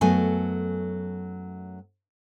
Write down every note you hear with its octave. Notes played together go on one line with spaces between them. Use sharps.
F#2 F#3 A3 B3 A4 G#5